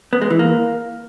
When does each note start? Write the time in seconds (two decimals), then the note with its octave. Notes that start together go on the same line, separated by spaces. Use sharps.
0.13 B3
0.22 G#3
0.30 E3
0.39 A#3